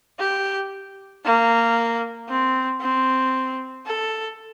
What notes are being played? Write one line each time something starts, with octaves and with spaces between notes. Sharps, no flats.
G4
A#3
C4
C4
A4